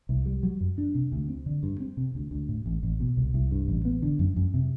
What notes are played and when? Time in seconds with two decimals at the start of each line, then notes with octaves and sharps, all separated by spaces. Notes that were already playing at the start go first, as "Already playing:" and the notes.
0.09 C2
0.26 G3
0.43 F#3
0.61 F#2
0.78 D4
0.95 C3
1.12 D2
1.29 C4
1.46 D3
1.63 G2
1.80 C4
1.97 C3
2.15 D2
2.31 D2
2.49 A2
2.66 A1
2.83 A1
3.00 B2
3.17 C2
3.34 C2
3.51 G2
3.68 A1
3.85 B3
4.02 D3
4.19 F#2
4.36 F#2
4.54 C3